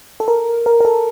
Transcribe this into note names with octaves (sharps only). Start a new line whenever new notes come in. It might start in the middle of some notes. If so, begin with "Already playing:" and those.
A4
A#4
A#4
A#4
A4